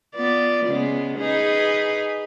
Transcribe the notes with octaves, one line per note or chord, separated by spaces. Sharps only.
B3 F4 D5
C#3 G#3 B3
D#4 G#4 B4